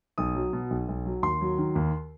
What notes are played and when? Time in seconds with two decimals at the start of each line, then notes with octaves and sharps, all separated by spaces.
0.18 B1 D#6
0.36 F#3
0.53 B2
0.70 B1
0.88 B1
1.06 F#3
1.23 D#2 C6
1.41 F#3
1.58 D#3
1.75 D#2